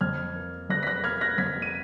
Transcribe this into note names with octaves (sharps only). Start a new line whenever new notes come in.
F2 F6 G#6
A#3
F2 F#6 A#6
B6
F#6 A#6
A#3 F6 G#6
F#6 A#6
F2 G#6 B6
D#7